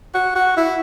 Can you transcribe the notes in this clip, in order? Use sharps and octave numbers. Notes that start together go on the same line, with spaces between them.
F#4
F#4
E4